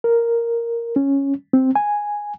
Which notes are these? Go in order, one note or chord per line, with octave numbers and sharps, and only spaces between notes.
A#4
C#4
C4
G#5